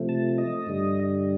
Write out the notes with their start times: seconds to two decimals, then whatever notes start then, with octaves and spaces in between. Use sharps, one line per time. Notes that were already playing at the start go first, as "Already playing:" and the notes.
Already playing: C3 F3 A3
0.09 A5
0.38 D#5
0.67 G2 D3 G3